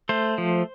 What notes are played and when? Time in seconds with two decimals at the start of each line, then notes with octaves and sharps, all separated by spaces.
0.09 A3 C5
0.38 F3